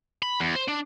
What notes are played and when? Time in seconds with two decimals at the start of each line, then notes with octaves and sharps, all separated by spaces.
0.23 B5
0.40 E2
0.55 C5
0.68 D4